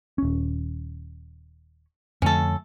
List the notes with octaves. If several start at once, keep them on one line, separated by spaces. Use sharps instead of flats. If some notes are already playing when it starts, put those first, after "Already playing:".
D#1 C#4
F2 D3 A3 C#4 A4